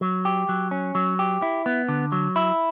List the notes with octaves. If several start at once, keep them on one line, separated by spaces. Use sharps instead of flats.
F#3
G4
F#3
C#4
F#3
G4
E4
B3
D3
F#3
E4